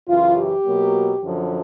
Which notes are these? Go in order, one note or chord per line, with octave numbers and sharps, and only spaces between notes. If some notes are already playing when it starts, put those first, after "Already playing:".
F#2 C#3 E3 F4
G4
B2 F#3 A#3
F#2 D3 F3